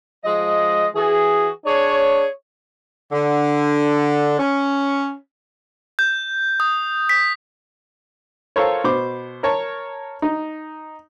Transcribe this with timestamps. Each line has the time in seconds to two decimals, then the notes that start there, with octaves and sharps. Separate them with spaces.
0.25 F3 G#3 D#5
0.95 E3 F#4 G#4
1.66 D4 G#4 C#5
3.12 D3
4.39 C#4
5.99 G6
6.60 D#6
7.09 B6
8.56 F4 A4 A#4 C5 C#5
8.84 B2 C5 D6
9.43 A#4 C#5 A5
10.22 D#4